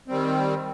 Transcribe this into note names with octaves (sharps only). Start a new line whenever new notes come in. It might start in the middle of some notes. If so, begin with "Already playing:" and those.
D#3 G3 C4